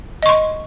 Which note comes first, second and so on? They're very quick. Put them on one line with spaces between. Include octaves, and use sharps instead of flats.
D#5 C#6 C6